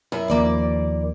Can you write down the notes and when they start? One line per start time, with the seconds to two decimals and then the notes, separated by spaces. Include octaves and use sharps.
0.12 F#2 E4
0.30 D#2 F3 A#3 D5